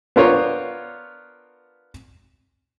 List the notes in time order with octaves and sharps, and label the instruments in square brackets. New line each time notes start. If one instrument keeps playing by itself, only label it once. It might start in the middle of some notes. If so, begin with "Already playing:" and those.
[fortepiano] B3 D4 F4 A#4 C5 C#5